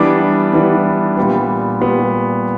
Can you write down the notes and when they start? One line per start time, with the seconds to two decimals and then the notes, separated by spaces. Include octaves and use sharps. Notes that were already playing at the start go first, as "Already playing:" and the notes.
Already playing: E3 G3 B3 D4 D6
0.53 E3 G3 B3 D4
1.17 A#2 G3 B3
1.81 A#2 G3 B3